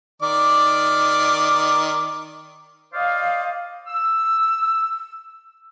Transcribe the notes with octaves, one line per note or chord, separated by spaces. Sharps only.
D#3 D5 D6
C5 D5 D#5 F5
E6